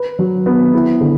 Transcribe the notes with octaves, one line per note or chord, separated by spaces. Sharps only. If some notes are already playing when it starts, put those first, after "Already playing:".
Already playing: B4
F#3
B3
E4
D3